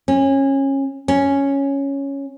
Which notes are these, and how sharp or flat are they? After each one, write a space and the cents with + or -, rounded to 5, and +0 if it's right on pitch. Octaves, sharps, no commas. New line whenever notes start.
C#4 -25
C#4 +0